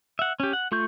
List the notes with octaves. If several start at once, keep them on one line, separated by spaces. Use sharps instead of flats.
E5 F#5
C#4 G4
F#5
A3 F4 C#6 G6